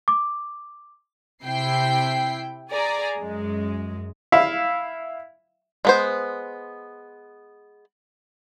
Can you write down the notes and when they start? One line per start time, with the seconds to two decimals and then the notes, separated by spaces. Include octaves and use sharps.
0.08 D6
1.43 C3 E4 G5 C7
2.70 G#4 D5 G#5 A#5
3.17 F#2 G#3
4.32 E4 E5 F5
5.85 G#3 B3 C5